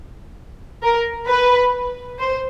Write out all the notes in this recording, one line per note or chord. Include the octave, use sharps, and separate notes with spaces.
A#4
B4
C5